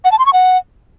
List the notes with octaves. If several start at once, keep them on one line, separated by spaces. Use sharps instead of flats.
F#5
A5
C6
C#6
F#5